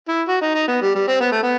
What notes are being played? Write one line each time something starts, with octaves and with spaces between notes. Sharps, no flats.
E4
F#4
D#4
D#4
B3
G3
G3
C4
B3
A3
B3